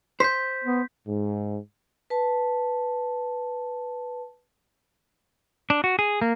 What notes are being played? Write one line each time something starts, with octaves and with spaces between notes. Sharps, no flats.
C5 G6 B6
B3
G#2
B4 A5
D4
F#4
G#4
A#3